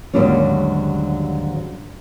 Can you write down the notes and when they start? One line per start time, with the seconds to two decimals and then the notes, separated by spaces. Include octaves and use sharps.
0.14 D#2 G#2 D3 F#3 G3 C#4